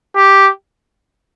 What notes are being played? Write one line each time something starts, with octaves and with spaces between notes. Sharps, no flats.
G4